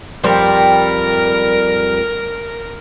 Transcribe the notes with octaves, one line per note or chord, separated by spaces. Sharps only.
F2 G3 A#4 C5